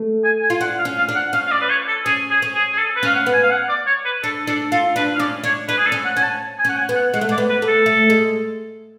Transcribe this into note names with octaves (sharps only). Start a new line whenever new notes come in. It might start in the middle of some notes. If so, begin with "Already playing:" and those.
Already playing: A3
G#5
G#5
F4
D4 F#5
F5
C#4
F5
D4
F#5
C#4 F5
F5
D5
B4
C#5
A4
C#4 G#4
G#4
C#4
G#4
G#4
A4
B4
C#4 F5
F#5
B3
G#5
F5
F#5
D5
C#5
B4
D4 A4
D4 A4
F4 A4
D4 B4
F5
C#4 D5
D4 C#5
D4 B4
G#4
A4
C#4
F#5
C#4 G#5
A5
G#5
C#4 F#5
G#5
B3
F#5
G#3 F#5
A3
G#3 D5
B3
B4
A3
A4
A3
G#3